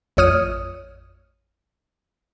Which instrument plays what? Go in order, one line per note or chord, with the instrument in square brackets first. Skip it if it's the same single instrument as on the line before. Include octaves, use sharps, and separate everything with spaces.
[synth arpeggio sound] A1 F2 C#5 D#6 F6 D#7